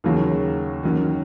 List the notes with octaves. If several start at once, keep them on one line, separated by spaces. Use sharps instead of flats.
D#2 C#3 F#3
D#3 F#3 C#4